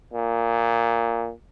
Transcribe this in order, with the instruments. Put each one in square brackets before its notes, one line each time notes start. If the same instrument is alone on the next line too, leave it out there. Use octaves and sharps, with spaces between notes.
[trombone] A#2